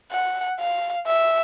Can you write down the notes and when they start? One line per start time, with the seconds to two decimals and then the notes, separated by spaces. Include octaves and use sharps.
0.11 F#5
0.59 F5
1.07 E5